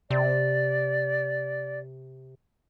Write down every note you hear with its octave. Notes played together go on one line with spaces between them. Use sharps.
C3 D5